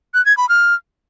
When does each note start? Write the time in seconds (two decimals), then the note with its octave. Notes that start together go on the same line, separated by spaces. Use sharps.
0.14 F#6
0.26 G#6
0.37 B5
0.49 F6